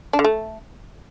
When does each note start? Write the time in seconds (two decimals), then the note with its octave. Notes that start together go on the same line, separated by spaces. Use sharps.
0.13 D4
0.19 D3
0.24 A3